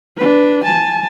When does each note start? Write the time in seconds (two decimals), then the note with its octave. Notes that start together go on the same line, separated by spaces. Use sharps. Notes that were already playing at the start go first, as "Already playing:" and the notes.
0.17 D4 B4
0.64 G#5 A5